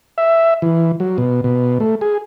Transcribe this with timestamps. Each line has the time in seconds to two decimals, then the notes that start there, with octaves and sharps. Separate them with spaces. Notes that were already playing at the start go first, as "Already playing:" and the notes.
0.18 E5
0.62 E3
1.00 F#3
1.18 B2
1.44 B2
1.80 A3
2.01 G#4